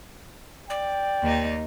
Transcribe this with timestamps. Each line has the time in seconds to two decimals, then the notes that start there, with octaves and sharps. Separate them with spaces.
0.70 D5 G5
1.22 D#2 D#4